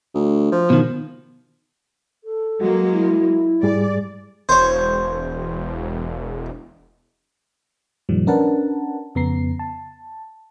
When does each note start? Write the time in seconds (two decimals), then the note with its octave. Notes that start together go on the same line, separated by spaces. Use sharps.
0.14 D2
0.52 F3
0.70 B2 D#3
2.23 A4
2.61 F#3 G#3 A#3 F#4
2.91 E4
3.63 G#2 G3 G#4 D5
4.49 E1 C5 C#5
8.09 F#2 A#2 D#3 F3 G3
8.27 C#4 D4 A#4 B4 F#5 A5
9.15 F2 C#3 B3 A#5 C7
9.59 A5